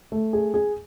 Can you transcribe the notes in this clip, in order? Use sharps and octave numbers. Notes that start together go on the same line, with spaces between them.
A3
G#4
G#4